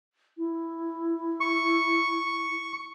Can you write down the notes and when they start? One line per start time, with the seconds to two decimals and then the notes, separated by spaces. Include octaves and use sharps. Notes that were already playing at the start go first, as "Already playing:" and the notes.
0.38 E4
1.40 C#6